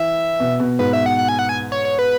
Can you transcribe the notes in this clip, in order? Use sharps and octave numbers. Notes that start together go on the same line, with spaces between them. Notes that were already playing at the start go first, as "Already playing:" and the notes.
Already playing: E3 E5
B2
B2
G#2 B4
E5
F#5
F#5
G#5
F#5
G#5
C#5
C#5
B4